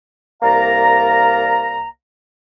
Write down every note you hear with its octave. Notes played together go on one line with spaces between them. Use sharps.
C2 A#3 D5 F5 A#5